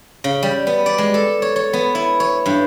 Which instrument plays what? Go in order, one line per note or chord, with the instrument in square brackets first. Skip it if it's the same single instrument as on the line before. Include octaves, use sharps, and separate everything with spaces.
[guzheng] C#3
G3
B3
D5
G#3
A4
C#5
C#5
B3
E4
C#5
G2